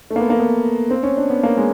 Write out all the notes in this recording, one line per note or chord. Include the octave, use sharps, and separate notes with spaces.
A3
A#3
B3
A#3
B3
C4
C#4
D4
B3
A#3
G#3